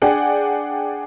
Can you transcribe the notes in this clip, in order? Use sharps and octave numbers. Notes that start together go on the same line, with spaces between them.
D4 G#4 D5 F#5 G5